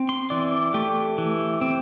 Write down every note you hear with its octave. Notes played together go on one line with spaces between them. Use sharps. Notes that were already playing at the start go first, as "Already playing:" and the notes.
Already playing: C4
C6
E3 D5
A3 G4
E3
C4